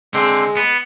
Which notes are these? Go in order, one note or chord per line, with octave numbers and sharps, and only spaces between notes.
D3 G#3 C4
B3